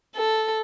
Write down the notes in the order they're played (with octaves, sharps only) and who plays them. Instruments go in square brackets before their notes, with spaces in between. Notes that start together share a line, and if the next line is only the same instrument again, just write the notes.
[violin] A4